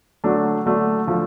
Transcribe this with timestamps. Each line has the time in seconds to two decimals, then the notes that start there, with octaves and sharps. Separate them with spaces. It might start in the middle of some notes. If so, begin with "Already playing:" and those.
0.24 D3 F#3 A3 D4
0.66 D3 F#3 A3 D4
1.07 D3 F3 A3